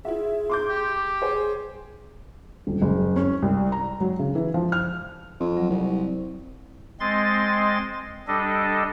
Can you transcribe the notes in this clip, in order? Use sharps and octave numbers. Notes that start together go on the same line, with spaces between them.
E4 F4 G#4 E5
C6 D6 G6
G4
G#4 C5 C#5 G#5
D#1
F#1
C#4
C2
A#5
F#3
C#3
E3
F3
F6
F2
F#3
C2
G#3 C4 D#5 C6 A6
G3 D4 A4 D#5